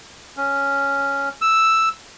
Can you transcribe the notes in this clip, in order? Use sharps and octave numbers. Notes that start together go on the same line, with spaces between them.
C#4
E6